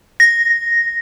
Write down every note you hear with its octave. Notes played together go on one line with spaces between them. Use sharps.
A#6